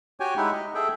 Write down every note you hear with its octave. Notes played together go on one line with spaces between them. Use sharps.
F#4 G4 C#5 G5 G#5
G#3 D#4 E4 G4 E5 F#5
D#5
G#4 A4 E5 G5